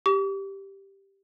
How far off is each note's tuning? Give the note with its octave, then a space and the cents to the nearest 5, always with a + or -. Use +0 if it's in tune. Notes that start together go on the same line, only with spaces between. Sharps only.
G4 +0 D6 -45